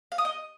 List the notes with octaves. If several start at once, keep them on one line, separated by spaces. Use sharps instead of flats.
F5
D#6
D#5